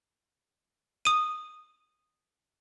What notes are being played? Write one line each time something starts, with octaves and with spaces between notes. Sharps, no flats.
D#6 D#7